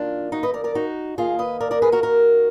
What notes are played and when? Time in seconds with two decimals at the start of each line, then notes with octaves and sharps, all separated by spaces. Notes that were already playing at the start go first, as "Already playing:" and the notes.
Already playing: F#2 D#3 A#3 D4 F4
0.32 D#4 F#4
0.43 B4 D#5
0.54 A#4 D5
0.64 A#4 D5
0.75 D#4 F#4
1.18 D#2 D#3 A#3 F4 G#4
1.39 B4 D#5
1.60 A#4 D5
1.71 A#4 D5
1.82 G#4 B4
1.92 F#4 A#4
2.03 F#4 A#4